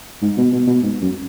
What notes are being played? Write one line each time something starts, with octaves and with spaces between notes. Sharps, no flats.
G#2
B2
B2
B2
G#2
F#2